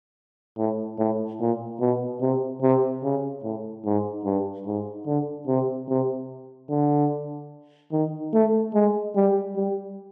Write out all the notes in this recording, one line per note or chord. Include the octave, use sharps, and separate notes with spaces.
A2
A2
A#2
B2
C3
C3
C#3
A2
G#2
G2
G#2
D3
C3
C3
D3
D#3
A3
G#3
G3
G3